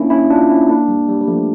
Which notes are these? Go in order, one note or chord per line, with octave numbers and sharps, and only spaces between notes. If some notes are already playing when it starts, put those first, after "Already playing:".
Already playing: A#3 C#4 D4 E4
C#4 E4
D4 F4
C#4 E4
A#3 D4
G3
G3
G3
F3 A3